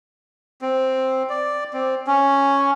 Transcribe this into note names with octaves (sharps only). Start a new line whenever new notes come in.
C4
D5
C4
C#4